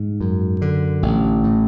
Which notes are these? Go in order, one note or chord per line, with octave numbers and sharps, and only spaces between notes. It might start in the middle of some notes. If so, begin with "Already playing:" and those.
Already playing: G#2
F#2
D3
A1
A2